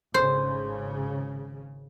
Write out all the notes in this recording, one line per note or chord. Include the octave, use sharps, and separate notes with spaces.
G#1 C#3 C5